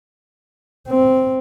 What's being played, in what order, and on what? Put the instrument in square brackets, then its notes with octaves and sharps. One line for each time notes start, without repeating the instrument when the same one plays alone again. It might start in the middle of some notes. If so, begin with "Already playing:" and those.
[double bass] C4